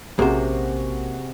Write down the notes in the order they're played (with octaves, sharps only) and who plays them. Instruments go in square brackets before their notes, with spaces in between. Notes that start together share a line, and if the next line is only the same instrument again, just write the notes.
[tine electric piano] A#1 [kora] C3 [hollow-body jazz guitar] A#3 C5 [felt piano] C#4 F#4 G#4